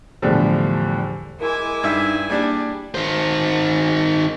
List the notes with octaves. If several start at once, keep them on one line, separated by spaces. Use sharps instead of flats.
E2 A2 D3 F3 G3
G#3 E4 A#4 G#5 D6
G2 D#4 E5
G3 A#3 D4 G#4 D5
D#3 C5